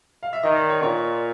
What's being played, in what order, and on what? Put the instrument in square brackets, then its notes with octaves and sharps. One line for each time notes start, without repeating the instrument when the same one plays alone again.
[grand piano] F5
E5
[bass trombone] D#3 [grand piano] D#5
[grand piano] D5
C#5
[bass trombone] A#2 [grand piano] C#5